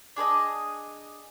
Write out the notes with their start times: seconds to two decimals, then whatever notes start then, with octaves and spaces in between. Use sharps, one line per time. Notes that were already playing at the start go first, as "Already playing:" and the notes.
0.16 D4 G#4 B4 D#5